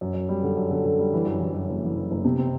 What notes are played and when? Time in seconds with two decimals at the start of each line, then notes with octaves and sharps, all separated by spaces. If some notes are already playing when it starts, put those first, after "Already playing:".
0.01 F#2
0.14 F#2
0.29 G3
0.43 D3
0.57 F#2
0.71 D3
0.84 D3
0.99 G3
1.13 E3
1.26 F#2
1.40 E3
1.54 F#2
1.69 F#1
1.82 E3
1.96 F#1
2.11 F#1
2.25 C3
2.39 C4